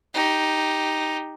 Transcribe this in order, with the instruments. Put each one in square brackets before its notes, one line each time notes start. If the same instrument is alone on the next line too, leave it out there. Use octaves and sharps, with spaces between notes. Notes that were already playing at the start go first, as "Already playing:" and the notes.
[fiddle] D#4 G4